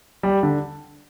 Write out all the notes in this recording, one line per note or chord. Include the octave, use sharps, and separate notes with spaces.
G3
D3